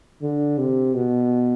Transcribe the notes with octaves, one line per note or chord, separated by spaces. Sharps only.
D3
C3
B2